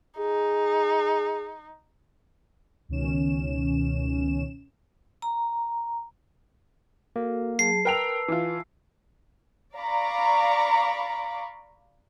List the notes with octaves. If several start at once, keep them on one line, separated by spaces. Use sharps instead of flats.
D#4 G#4
C#2 B2 D#3 C#4 E7
A#5
A#3 F#4 A4
F#3 G#4 A5 C7
A#4 B4 G5 A5 E6 F7
E3 F4
D5 F5 A#5 B5 C#6 D6